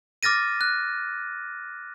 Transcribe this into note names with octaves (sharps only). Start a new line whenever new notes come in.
D6 F6 A6 A#6 D#7
F#6